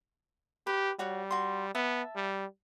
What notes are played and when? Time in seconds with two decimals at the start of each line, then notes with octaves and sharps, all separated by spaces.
0.67 G4 B4
0.99 G3 F#4 C#5 F#5
1.31 F#4 C6
1.75 B3 E5 A5
2.16 G3